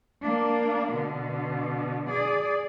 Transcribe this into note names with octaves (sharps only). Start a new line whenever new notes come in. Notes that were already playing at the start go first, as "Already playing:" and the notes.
A#3 D4
B2 D3
G#4 D5